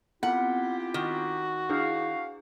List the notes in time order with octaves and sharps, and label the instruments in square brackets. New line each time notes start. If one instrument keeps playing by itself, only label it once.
[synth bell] B3 C4 [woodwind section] E4 F4 G4 [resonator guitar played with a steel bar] F#5
[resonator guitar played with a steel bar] D#3 [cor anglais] F#4
[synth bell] D4 E4 G#4 [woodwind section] F5